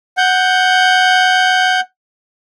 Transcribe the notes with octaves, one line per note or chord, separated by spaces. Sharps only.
F#5 G6